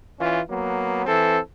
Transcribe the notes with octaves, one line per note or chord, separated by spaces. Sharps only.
E3 C#4 F4
F#3 A#3 B3
E3 C4 A4